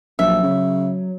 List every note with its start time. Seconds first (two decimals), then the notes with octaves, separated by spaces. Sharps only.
0.19 A#1 F#3 E5
0.43 C#3